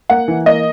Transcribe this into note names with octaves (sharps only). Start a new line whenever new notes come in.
A#3 F#5
E3
A#3 D#5